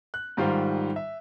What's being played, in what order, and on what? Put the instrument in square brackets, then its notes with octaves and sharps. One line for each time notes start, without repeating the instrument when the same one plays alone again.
[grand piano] F#6
G#2 D#3 G3 F4 C5
E5